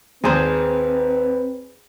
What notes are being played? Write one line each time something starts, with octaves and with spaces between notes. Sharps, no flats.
G#1 D#2 C4 G#4 B4 C5 D#6